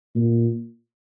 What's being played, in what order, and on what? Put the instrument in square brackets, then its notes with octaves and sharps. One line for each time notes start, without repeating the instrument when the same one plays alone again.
[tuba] A#2